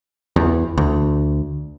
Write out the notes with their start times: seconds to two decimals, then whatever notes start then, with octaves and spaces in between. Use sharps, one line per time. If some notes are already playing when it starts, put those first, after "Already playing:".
0.36 E2
0.78 D2